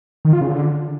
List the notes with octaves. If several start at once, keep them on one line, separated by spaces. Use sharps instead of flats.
D#3
F4
C#3
D3